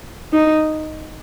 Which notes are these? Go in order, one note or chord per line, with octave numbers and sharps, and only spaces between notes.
D#4